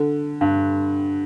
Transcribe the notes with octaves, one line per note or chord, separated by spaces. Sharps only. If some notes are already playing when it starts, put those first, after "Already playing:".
Already playing: D3
G2